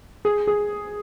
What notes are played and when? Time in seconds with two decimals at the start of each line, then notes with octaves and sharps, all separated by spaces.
0.25 G#4
0.47 G#4